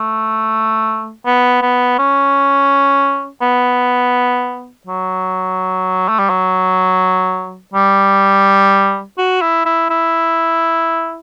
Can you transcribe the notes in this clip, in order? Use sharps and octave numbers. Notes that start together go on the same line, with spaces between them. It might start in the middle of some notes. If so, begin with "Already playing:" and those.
Already playing: A3
B3
B3
C#4
B3
F#3
A3
G3
F#3
G3
F#4
E4
E4
E4